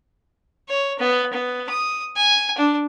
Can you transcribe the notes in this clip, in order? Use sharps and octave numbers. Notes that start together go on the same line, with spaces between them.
C#5
B3
B3
D#6
G#5
D4